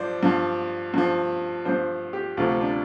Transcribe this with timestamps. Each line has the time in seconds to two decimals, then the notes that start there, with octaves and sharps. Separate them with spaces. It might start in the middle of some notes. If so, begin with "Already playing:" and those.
Already playing: G2 F3 C5 D5
0.23 G2 F3
0.94 G2 F3
1.65 G2 F3 C5
2.13 G4
2.37 D2 C3 F3 F4
2.61 D4